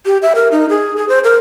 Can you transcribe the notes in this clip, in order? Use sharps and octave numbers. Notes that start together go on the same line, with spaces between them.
G4
E5
A#4
D#4
G#4
G#4
C5
A#4